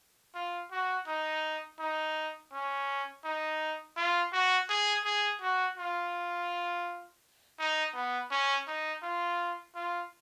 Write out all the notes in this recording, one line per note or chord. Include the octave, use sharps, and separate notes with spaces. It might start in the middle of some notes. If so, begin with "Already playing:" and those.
F4
F#4
D#4
D#4
C#4
D#4
F4
F#4
G#4
G#4
F#4
F4
D#4
B3
C#4
D#4
F4
F4